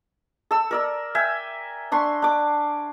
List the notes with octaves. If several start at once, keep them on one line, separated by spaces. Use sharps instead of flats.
A4 E6
A#4 D5 E6
E5 G5 G#5
D4 C6 C#6
D4 D6